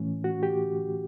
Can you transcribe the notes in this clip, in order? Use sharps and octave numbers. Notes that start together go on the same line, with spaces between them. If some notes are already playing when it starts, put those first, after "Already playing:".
Already playing: A2 E3 A3 C#4
F#4
G4